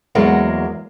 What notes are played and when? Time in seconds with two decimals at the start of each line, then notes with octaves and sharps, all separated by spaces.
0.15 E2 F#3 G#3 A#3